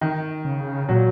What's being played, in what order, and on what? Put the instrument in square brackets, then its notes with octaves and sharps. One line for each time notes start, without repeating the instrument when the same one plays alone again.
[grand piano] D#3
[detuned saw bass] C#3
[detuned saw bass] A#2 [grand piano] F#3